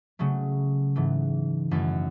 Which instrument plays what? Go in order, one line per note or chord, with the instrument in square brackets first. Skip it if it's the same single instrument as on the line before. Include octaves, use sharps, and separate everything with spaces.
[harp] C#3 F#3 A3
G#2 E3 A3
F#2 D#3 A3 E4